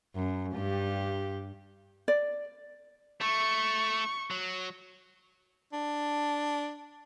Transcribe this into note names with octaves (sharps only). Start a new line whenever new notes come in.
F#2
G2 G4
D5
A3 C#6
F#3
D4